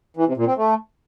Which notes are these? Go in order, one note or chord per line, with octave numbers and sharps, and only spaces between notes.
E3
C3
A#2
C4
A3